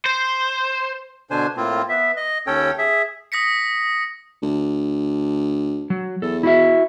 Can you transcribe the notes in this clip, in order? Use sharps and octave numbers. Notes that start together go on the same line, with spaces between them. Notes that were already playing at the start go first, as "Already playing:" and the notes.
C5
B2 D3 D4 C5 G#5
A2 A#3 C4 F4
B3 E5
D#5
D#2 C#4 A4 C#5 G5
G#4 E5
D#6 A#6 B6 C#7
D2
F#3
E2 A4
E4 F#4 E5